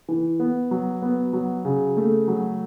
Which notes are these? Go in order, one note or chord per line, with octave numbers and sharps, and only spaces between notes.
E3
B3
F#3
B3
F#3
C#3
A3
F#3